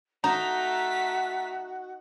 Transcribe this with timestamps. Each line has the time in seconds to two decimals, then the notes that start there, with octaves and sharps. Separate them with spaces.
0.24 A3 D#4 F#4 A#5 B6